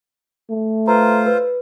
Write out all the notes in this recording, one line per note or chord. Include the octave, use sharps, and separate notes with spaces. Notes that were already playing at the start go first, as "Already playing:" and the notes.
A3
F4 B4 C5 A#5
B4